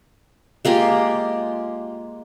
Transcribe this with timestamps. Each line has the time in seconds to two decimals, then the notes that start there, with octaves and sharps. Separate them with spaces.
0.65 G#3 A#3 F4 G4